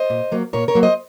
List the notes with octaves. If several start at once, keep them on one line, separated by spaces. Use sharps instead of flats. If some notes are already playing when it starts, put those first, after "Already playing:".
Already playing: C5 D#5
A#2
F#3 A#3
A#2 A#4 C#5
A#4 C#5
F#3 A#3
C5 D#5